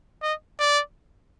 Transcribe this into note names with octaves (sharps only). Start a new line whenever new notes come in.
D#5
D5